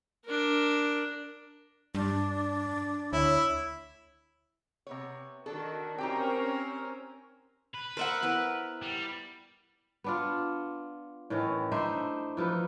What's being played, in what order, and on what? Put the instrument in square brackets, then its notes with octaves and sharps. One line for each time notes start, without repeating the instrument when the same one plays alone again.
[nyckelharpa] D4 A#4
[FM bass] G2 [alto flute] D4
[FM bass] D2 [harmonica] E4 [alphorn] C#5
[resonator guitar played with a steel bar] C3 B3 C#5
[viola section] D#3 F#4 [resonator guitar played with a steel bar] D4 A4
[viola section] C4 C#4 A#4 [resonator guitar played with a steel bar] D#4 G4 G5
[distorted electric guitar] B4
[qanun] A#4 [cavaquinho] C5 E5 F#5
[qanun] B3 E4 A#4
[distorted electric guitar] G3
[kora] B3 D4 F4
A2 D#3 E3 C#4
D4 D#4 C5 E5
E3 F3 D#4 B4